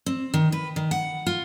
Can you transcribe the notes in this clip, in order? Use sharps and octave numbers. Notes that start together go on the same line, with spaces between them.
C4
D#3
B4
D#3
F#5
F4